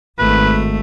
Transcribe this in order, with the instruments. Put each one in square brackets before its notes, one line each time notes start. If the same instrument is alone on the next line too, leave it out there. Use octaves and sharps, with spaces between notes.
[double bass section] G#1 [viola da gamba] A3 [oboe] B4